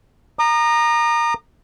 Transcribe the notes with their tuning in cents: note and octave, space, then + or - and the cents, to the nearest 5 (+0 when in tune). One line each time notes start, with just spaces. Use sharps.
A#5 +0 D#6 -40